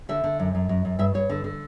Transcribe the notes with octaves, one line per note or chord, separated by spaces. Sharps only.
D3 E5
D3
F#2
F#2
F#2
F#2
G2 E5
G2 C#5
D3
D3